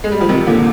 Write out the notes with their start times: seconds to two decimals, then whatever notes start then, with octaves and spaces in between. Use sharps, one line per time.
0.04 G#3
0.12 G3
0.20 F3
0.29 C3 D#3
0.47 A#2 D3